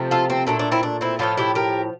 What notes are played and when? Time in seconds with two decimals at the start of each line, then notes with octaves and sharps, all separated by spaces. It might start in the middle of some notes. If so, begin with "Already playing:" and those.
Already playing: C3 F3 A3
0.11 F4 A4
0.30 C4
0.47 A#2 A3 D4
0.59 D4
0.71 C4 E4
0.83 D4
1.01 C4 E4
1.19 A2 F3 A3 D4 F4
1.37 E4 G4
1.55 G4 A#4